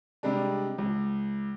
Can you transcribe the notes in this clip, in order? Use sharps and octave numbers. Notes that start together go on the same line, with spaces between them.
C3 G3 G#3 D4
C#2